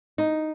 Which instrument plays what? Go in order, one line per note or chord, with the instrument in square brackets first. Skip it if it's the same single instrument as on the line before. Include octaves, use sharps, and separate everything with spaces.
[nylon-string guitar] D#4